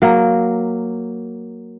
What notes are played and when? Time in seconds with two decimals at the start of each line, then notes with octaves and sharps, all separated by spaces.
0.02 F#3 A#3